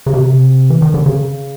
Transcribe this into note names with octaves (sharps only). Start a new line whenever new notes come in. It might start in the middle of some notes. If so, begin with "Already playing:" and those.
C#3
C3
E3
D#3
D3
C#3